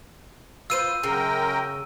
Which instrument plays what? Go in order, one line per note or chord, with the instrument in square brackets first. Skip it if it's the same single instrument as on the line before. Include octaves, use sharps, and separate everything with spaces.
[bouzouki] F4 B4 C5 [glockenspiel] E6 D#7
[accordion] F#2 A#4 G5 [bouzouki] C#3